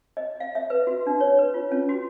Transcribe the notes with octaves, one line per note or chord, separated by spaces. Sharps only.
D#5
F5
E5
B4
F#4
D4
C#5
B4
F4
C#4
F#4